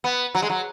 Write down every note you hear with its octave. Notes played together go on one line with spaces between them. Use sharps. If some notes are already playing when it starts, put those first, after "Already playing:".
B3
F#3
G#3
F#3